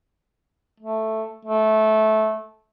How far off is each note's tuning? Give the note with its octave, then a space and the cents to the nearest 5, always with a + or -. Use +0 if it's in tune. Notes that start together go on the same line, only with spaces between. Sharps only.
A3 +0
A3 -15